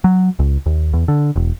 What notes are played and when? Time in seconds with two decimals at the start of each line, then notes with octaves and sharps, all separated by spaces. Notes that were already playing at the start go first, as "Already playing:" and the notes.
0.04 F#3
0.39 C#2
0.66 D#2
0.93 E2
1.08 D3
1.36 E1